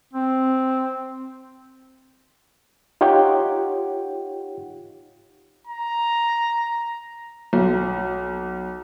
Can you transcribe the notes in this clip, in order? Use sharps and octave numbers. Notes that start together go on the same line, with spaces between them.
C4
D#4 F4 G4 C#5 F#5 G5
A#5
B1